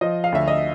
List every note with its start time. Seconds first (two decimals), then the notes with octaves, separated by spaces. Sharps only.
0.01 F3 D#5
0.24 F5
0.32 D2 E5
0.48 D#5